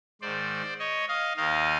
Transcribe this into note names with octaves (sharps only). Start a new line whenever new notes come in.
G#2 D#3 C5 D5
C#5 D#5
D#5 F5
D#2 D#3 D#5 F5